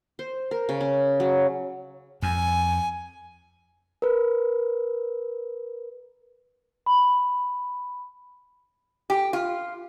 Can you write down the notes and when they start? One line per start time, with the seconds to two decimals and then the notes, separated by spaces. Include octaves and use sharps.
0.19 C5
0.51 A#4
0.69 C#3
0.81 C#4
1.20 F#3
2.23 F2 G#5
4.02 A#4 B4
6.86 B5
9.10 G4
9.33 F4